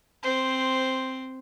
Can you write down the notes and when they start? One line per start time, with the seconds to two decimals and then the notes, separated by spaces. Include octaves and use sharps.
0.23 C4 C5